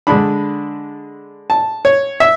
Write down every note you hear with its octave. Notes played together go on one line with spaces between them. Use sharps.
D3 G#3 D4 B5
A5
C#5
E5